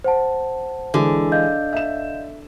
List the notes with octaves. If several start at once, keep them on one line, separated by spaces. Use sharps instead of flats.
C5 F#5 A5
D3 E3 G#3
D#5 F5 G6
E5 E7